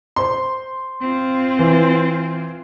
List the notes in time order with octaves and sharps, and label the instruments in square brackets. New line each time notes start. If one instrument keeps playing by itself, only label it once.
[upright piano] C5 C6
[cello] C4 F4
[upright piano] E3